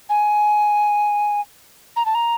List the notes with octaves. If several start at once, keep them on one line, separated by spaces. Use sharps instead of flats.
G#5
A#5
A5
A#5